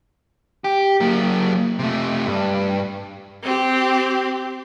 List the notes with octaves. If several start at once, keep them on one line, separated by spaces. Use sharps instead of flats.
G4
F#3 A#3
C3 A3
G2
C4 G4